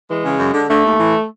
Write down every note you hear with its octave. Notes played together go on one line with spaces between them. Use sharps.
E3 G#3
C#3
F#2
D3
D3 A3
D#2
E3